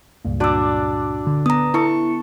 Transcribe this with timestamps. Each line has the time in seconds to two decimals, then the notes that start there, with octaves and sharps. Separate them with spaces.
0.25 C#2 G2 A#2
0.40 D4 F#4 D5 E6
1.27 D3
1.46 B3 A#5 D#6
1.74 E4 A4 C#6